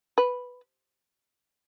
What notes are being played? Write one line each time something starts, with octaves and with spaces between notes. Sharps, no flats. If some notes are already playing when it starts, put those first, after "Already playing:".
B4